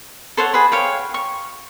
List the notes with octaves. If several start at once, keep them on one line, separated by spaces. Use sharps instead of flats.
A4 C5 C#5 F#5
G#4 B4
C#5 F5 G5
C#6